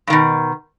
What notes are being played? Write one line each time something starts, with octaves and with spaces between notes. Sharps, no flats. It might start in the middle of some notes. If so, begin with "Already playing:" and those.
G2 B2 D#3